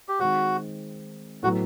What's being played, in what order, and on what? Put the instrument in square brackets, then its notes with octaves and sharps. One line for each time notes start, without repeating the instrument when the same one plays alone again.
[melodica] G4
[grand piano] D#3 G#3 C4 [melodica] F#4
[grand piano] A2 F#3 B3 [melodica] F#4